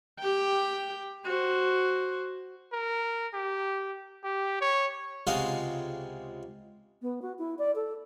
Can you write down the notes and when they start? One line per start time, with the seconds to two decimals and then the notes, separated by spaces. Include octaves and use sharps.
0.20 G4 G5
1.26 F#4 C5
2.73 A#4
3.34 G4
4.24 G4
4.61 C#5
5.27 C#2 C3 G#3 F#4 G#4 F5
7.02 B3
7.22 F#4
7.38 E4
7.58 D5
7.75 A4